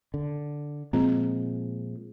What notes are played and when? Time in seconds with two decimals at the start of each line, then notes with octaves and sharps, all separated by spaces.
0.14 D3
0.93 A#2 F3 G#3 C4